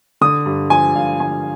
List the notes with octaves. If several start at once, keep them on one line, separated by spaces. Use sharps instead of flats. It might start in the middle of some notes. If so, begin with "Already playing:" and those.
D3 D#6
G2
F3 G#5
G2 F5
D3 G#5